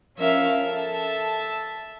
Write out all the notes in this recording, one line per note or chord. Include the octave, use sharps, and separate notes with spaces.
F3 C#4 A#4 E5 F5
A4 E5 A5